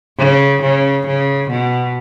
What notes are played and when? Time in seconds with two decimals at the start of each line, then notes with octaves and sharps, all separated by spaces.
0.18 C#3
0.62 C#3
1.07 C#3
1.51 B2